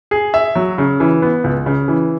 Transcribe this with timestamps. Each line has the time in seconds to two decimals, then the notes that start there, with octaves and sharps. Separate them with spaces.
0.11 G#4
0.34 E5
0.56 F#3
0.78 C#3
1.00 E3
1.22 B3
1.44 C#2
1.66 C#3
1.88 E3